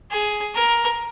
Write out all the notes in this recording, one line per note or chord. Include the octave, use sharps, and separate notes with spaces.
G#4
A#4